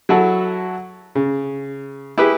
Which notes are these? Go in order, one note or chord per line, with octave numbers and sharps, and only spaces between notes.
F#3 E4 F#4 A4
C#3
E4 G4 G#4 B4